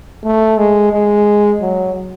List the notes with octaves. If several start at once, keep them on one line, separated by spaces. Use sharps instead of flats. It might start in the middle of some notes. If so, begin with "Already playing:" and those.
A3
G#3
G#3
F#3